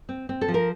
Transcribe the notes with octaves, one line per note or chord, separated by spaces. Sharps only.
C4
C4
A4
F3
A#4